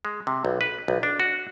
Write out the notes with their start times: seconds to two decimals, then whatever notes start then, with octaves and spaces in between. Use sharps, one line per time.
0.05 G#3
0.27 C3
0.45 B1
0.61 B4
0.88 B1
1.03 D4
1.20 F#4